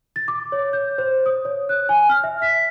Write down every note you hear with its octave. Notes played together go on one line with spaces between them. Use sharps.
A6
D6
C#5
G6
C5
D#6
C#5
F#6
G#5
F6
E5
B6